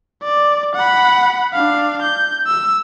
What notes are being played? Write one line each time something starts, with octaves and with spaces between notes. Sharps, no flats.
D5
F#5 B5
D4 F5
G6
E6